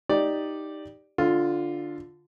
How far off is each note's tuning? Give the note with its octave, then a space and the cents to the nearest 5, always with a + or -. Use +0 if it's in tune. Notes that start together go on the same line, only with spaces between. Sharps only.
D#4 +0 G4 +0 D5 +0
D3 +0 F4 +5